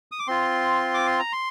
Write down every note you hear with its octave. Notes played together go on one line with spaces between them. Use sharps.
D#6
D6
C4 F4 C6
D6
C6
A#5
C6